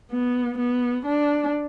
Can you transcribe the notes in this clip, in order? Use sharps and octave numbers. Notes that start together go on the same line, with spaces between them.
B3
B3
D4